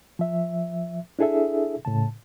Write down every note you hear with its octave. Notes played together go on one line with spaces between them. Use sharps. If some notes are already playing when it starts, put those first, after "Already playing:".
F3 E5
D4 E4 G#4 A4 E5
A2 C#3 A5